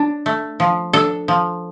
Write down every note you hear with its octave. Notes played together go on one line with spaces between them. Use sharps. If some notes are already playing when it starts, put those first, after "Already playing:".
Already playing: D4
A3
F3
D4 A4
F3